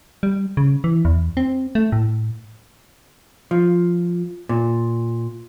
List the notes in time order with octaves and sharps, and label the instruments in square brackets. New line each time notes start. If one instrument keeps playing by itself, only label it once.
[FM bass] G3
C#3
E3
E2
C4
A3
A2
[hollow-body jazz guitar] F3
A#2